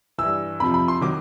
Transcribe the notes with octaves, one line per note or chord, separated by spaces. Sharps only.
G2 E3 E6
F2 C3 F3 B5
B5
C6
D#3 F#3 D6